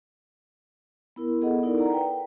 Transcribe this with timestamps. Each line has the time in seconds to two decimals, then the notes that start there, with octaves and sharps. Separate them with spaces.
1.16 B3 E4 A#4
1.41 B3 G#4 A4 D#5 F#5
1.63 D#4 E4 A4 A#4 D5
1.78 D5 F#5 A#5
1.92 B4 G5